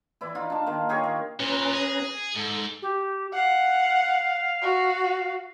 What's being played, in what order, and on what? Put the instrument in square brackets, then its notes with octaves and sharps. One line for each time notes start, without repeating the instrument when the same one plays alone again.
[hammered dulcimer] E3 E4 D5
D#4 F4
D4 A5
D#3 A#3
G4 G#4 A#4 C#5
A#4
[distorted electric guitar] A#2 [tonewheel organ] C#4 B4 A#5
[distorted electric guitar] G#4
[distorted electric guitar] G#2 [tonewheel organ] A4
[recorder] G4
[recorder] F5 [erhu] F#5
[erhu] F#4